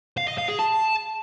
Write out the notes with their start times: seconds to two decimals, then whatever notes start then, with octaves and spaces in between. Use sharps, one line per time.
0.17 F5
0.28 D#5
0.38 F5
0.49 G#4
0.59 A5